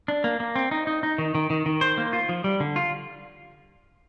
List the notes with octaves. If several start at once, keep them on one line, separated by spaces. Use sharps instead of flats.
D4
A#3
A#3
C4
D#4
D#4
D#4
D#3
D#3
D#3
D#3
C5
A#3
F4
F3
G3
D3
F4